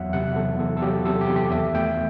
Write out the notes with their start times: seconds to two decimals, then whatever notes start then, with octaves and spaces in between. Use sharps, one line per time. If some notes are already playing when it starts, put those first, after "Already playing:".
Already playing: E2 F#3 E5 F#5
0.13 C3 F#5
0.36 E2 A4
0.59 E2 A4
0.77 A4
0.82 F#3 G4
1.06 C3 A4
1.21 G4
1.28 E2
1.36 G4
1.51 D#2 E5
1.74 A3 G5